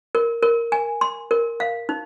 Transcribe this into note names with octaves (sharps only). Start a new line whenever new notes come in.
A#4
A#4
G#5
C6
A#4
F5
D#4